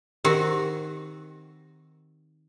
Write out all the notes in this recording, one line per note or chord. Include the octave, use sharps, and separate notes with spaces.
D#3 C4 F#4 G4